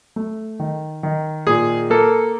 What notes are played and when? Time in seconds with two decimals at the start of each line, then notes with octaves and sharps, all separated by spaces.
0.16 A3
0.60 D#3
1.03 D#3
1.47 A#2 G#4
1.90 A#3 A4